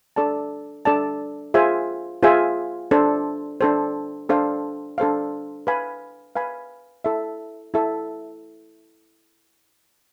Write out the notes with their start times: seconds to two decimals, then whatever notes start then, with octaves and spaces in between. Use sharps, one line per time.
0.16 D4 A4 D5 A5
0.85 D4 A4 D5 A5
1.54 F4 G#4 C5 E5 G#5
2.23 F4 G#4 C5 E5 G#5
2.91 D4 A4 C5
3.61 D4 A4 C5
4.29 D4 A4 C5 F5
4.98 D4 A4 C5 F5
5.67 B4 F5 G#5 B5
6.35 B4 F5 G#5 B5
7.04 E4 A4 E5
7.74 E4 A4 E5